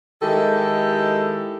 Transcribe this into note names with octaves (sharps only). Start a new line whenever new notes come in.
D#3 G#3 E4 G4 A4